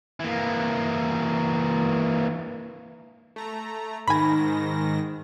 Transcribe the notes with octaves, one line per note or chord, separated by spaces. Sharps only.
E3 A#3
A3 A#5
G#2 D#3 G#5 B5 A#6